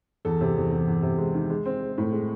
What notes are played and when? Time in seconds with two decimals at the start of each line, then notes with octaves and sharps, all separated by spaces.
0.25 E2 A4
0.41 C3
0.56 E2
0.71 E2
0.87 E2
1.02 C3
1.18 G#3
1.34 D#3
1.50 G#3
1.66 C4
1.81 G#3
1.98 A2
2.12 G#3